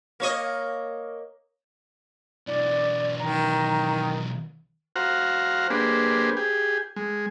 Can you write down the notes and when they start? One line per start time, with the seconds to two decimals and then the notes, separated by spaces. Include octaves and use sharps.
0.20 A#3 C#5 D#5
2.47 B1 E3 D5
3.19 D#3 A#5
4.96 F#4 C5 F5 F#5 A#5
5.70 A#3 D4 G4 G#4 B4 C5
6.37 G4 G#4
6.96 G#3